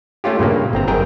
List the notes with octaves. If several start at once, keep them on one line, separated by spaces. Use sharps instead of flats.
A3 C#4 F4 G4
G2 A#2 C#3 A#3
G1 C4 A#5
G1 F#2 G#4 A#4 G5 A#5